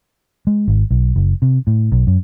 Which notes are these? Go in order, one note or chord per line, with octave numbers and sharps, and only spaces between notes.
G#3
G#1
B1
F#1
C3
A2
B1
F#2